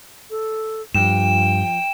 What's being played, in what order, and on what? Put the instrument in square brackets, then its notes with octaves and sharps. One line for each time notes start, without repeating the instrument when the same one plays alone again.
[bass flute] A4
[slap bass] G2 [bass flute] F3 [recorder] G5 [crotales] E7